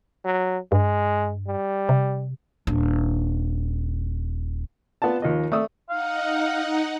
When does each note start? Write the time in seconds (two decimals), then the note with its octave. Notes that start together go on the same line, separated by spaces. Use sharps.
0.25 F#3
0.72 G2 G#3
1.47 G3
1.89 C3
2.67 D#1 D4
5.02 B3 F4 D5 A5
5.22 D#2 F3 D#5
5.52 A3 D5 D#6 E6
5.90 D#4 F5 F#5